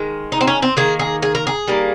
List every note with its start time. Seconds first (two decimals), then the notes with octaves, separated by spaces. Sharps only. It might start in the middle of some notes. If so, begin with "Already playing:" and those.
Already playing: D#3 G#3
0.32 D#4
0.41 C4
0.47 C#4
0.62 C4
0.77 D#3 A#3 G#4
0.99 G#4
1.22 G#4
1.35 A#4
1.47 G#4
1.68 D#3 G3 A#3